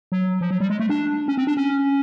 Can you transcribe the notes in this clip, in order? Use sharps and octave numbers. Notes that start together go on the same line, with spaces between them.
F#3
F3
F#3
G3
G#3
A3
D4
C#4
C4
D4
C#4